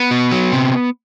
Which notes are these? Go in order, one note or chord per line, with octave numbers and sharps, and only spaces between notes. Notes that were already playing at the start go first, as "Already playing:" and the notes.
Already playing: B3
B2
F#3
C3